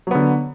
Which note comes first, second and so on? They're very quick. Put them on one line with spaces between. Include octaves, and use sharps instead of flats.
F#3 B3 D3